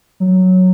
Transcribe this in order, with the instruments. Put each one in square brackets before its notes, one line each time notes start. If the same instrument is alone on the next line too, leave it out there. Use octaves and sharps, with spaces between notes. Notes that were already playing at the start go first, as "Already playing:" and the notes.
[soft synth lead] F#3